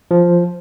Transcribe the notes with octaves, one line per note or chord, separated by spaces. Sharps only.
F3